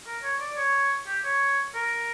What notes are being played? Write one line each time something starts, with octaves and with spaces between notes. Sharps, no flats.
A#4
C#5
D5
C#5
G4
C#5
A#4